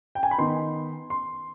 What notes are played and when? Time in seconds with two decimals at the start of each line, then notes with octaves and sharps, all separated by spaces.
0.15 G5
0.23 G#5
0.31 B5
0.38 D#3 B3 D#4 C6
1.10 C6